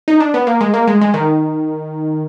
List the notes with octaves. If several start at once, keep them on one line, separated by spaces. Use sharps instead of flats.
D#4
D4
B3
A#3
G#3
A#3
G#3
G#3
D#3